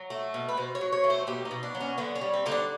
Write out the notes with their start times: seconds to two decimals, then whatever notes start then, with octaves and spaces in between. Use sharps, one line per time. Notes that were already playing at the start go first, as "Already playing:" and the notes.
Already playing: F#3
0.10 A3
0.34 B2
0.49 B4
0.57 B2 C5
0.75 C#5
0.81 F#3
0.92 C#5
1.04 A3
1.10 C5
1.27 B2 G4
1.45 D#4
1.51 B2
1.63 D4
1.75 F#3
1.81 C#4
1.98 D3 B3
2.15 C#4
2.21 G3
2.34 C4
2.46 D3 D#4
2.51 D4